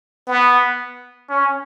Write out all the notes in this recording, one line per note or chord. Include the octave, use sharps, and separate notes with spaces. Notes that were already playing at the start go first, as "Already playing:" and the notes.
B3
C#4